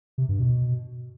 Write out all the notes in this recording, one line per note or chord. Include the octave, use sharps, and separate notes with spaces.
C3
G2
B2